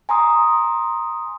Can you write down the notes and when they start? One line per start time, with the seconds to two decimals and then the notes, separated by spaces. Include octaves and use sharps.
0.09 G#5 A#5 C6 D#6